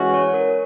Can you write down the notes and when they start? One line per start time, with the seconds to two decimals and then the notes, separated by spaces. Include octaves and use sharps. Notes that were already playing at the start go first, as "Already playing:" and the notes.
Already playing: E3 G#3 C#4 F#4
0.14 C#5
0.34 A#4